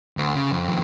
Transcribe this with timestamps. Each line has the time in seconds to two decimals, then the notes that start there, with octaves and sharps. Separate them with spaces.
0.17 D2
0.35 C#3
0.51 F2
0.69 F2 D#3